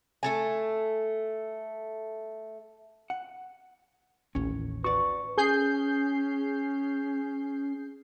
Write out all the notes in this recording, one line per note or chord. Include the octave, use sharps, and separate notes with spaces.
A3 A4 G#5
F#5
A1 D#2 C#4
F#4 B4 D5 C#6
C#4 G#4 G6 C7